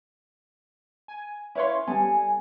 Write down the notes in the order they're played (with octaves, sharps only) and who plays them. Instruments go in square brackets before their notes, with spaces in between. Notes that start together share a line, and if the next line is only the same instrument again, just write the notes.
[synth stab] G#5
[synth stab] C#4 B4 C#5 [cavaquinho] E4 F5 C6
[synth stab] G3 B3 [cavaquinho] A4 [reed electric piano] G#5